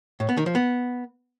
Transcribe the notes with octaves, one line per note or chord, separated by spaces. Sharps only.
A2
B3
D#3
F3
B3